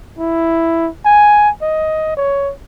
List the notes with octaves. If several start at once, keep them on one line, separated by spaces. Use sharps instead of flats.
E4
G#5
D#5
C#5